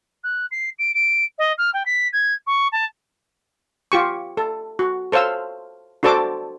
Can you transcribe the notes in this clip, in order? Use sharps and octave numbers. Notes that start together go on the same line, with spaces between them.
F#6
C7
D7
D7
D#5
F6
G5
B6
G#6
C#6
A5
F4 G4 C#6
A4
F#4
A4 C5 C#5 F5 E6
D4 F#4 A4 C5 A5 D6